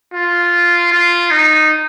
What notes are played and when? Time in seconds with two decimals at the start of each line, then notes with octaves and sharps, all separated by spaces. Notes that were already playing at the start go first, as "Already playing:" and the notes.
0.13 F4
0.92 F4
1.31 D#4